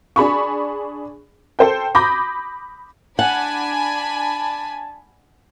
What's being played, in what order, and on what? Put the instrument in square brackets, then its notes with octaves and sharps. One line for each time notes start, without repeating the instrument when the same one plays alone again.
[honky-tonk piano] D4 G#4 B5 C#6
A4 C5 G5
B5 D6 D#6 G6 A#6
[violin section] D4 G#5 B5 [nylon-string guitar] F#5 [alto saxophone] A5